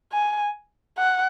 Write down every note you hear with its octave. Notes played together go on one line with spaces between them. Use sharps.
G#5
F#5